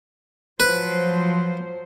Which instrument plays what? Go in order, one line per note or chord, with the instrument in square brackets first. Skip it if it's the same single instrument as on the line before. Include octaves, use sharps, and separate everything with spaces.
[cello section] F3 F#3 C5 [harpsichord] B4